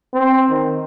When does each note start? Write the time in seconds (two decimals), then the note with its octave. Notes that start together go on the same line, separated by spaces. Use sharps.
0.14 C4
0.50 D#3